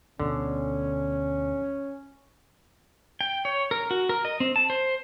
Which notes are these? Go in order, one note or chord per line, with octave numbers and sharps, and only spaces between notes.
D2 B2 D3 C#4
G5
C#5
A#4
F#4
A#4
D#5
C4
A5
C5